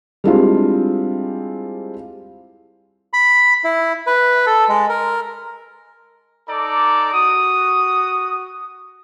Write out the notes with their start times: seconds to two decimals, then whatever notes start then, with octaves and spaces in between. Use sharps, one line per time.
0.24 G3 G#3 C4 D4 E4 F4
3.13 B5
3.64 E4
4.07 B4
4.46 A4
4.69 G#3
4.89 A#4
6.49 D#4 A4 D5 A#5 D6
7.14 F#4 D#6